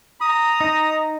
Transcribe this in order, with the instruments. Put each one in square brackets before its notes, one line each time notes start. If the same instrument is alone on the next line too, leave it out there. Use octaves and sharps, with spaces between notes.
[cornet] A#5 [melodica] D#6
[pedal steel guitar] D#4